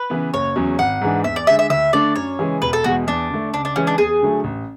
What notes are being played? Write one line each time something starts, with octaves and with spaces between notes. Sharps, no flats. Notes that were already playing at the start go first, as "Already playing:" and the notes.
Already playing: B4
C#3 E3 B3
F#1 C#5
E2 C#3 F#3 C#4
G#1 F#5
G#2 E3 G#3 D4
E2 E5
D5
D3 G#3 E5
E5
D2 E5
D3 A3 D4 D5
F#2 C#5
C#3 E3 G#3
E1 B4
A4
E2 B2 G#3 F#4
E2 D4
D3 A3
C#2 D4
D4
C#3 E3 G#3 C#4
D4
E2 G#4
D3 F#3 A3
A1